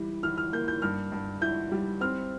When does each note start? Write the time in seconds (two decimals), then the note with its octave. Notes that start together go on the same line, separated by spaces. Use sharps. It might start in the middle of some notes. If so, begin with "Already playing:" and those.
Already playing: E3 G3
0.23 E3 F6
0.38 F6
0.53 A#3 G6
0.68 G6
0.82 G2 F6
1.12 G2
1.41 E4 G6
1.72 G3
2.01 C4 F6